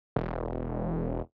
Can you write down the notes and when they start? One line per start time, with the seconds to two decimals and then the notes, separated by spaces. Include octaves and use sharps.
0.16 E1